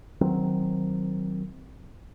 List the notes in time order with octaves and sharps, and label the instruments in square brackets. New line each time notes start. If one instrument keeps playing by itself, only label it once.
[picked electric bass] D#3 F#3 C4